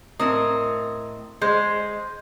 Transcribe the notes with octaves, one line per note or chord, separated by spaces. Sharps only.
A2 C4 A#4 D#5
G#3 C5